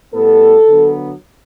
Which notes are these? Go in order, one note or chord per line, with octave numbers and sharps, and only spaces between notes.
A2 G3 B3 A4
D3 F#3 B3